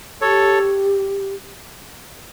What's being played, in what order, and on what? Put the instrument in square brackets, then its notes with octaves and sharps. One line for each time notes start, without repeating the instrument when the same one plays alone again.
[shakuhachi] G4 [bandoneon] A4 C#5